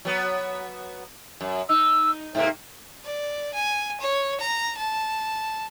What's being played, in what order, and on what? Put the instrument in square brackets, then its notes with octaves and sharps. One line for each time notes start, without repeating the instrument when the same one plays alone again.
[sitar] F#3 B3
F#2
[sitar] D#4 [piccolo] E6
[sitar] G#2 C3 A#3 [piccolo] E5
[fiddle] D5
G#5
C#5
A#5
A5